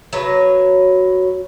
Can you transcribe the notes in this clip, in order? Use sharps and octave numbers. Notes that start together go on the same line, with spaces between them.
F#3 B4 C#5